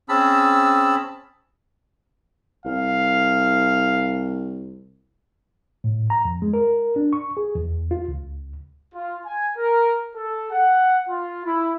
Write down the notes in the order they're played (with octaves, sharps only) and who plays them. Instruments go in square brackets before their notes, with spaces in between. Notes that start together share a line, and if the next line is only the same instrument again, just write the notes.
[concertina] C4 C#4 G#4 A5 B5 E6
[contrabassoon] C2 [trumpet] F5
[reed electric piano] A2
A#5
F2
G#3
A#4
D4
C#6
G#4
E2
F4
C#2
[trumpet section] F4
G#5
A#4
A4
F#5
F4
E4